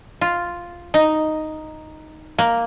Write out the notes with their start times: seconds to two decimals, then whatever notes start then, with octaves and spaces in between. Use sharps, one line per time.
0.21 F4
0.94 D#4
2.39 A#3